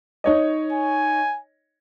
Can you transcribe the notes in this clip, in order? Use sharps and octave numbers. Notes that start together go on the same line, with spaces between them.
D#4 C#5 D#5
G#5